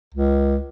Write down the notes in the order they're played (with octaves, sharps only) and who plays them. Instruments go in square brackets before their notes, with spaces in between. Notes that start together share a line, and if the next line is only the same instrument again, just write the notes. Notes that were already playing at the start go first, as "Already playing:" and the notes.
[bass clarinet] C#2